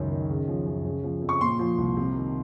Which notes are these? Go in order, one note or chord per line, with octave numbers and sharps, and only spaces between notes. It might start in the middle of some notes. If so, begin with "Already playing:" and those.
Already playing: C#2 F#2 D#3
D#3
C#3
F3
F#2
C#3
F3
F2
C#6
A#2 C6
F3
C2
C3
D#3